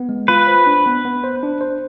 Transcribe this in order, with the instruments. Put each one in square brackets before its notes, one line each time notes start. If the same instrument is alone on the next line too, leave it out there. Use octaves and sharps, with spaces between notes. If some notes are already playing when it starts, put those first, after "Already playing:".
Already playing: [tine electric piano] B3
G#3
[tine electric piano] F4 [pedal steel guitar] B4
[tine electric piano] C5
D4
B3
B3
C5
D4
C5